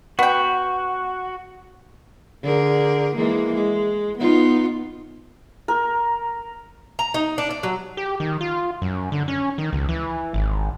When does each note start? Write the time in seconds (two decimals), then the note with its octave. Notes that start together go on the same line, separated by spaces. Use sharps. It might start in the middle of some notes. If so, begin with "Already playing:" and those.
0.19 B3 F#4 G5
2.43 D3 G#4 A#4
3.15 E3 G#3 A#3
3.55 G#3
4.18 B3 D#4 F4
5.68 A#4
6.99 A#5
7.14 D#4
7.38 D4
7.50 D5
7.63 F#3
7.97 G4
8.20 D#3
8.41 F4
8.82 F#2
9.12 D3
9.28 C#4
9.58 D#3
9.73 C#2
9.89 E3
10.34 G#1